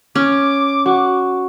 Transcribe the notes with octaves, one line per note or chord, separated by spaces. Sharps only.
C#4 D6
F#4